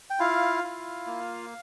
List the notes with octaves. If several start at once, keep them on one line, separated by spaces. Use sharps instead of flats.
G5
E4 F4 F5
E4
A#3